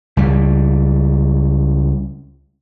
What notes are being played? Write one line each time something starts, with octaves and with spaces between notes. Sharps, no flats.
C#2 G3